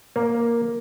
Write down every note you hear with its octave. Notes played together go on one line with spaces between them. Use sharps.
A#3